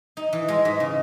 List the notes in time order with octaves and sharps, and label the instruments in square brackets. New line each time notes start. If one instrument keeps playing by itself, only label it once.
[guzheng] D#4
E3
G#3
G#2
C#3